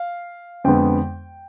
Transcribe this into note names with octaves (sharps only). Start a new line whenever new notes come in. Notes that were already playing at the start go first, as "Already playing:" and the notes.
Already playing: F5
F2 D3 G#3 B3 G5